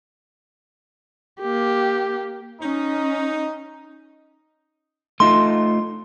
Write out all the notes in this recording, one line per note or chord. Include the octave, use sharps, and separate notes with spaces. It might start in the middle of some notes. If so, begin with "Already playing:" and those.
A#3 G4
C#4 D#4
A3 D#4 F4 C6